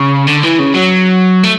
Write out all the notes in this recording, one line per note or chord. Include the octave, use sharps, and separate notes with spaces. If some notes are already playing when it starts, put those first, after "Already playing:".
Already playing: C#3
D3
E3
C#3
F#3
A3